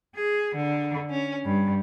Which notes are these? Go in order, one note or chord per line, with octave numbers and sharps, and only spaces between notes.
G#4
D3
C#4
G2